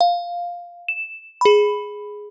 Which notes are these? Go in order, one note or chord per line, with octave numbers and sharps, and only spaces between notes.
F5
E7
G#4 B5